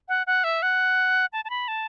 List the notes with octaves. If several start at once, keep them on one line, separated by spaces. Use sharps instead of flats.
F#5
F#5
E5
F#5
A5
A5
B5
A5